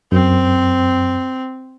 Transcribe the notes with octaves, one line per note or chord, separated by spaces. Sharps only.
F#2 C4